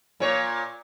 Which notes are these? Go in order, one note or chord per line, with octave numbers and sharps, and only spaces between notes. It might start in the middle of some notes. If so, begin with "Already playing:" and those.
A#2 C#5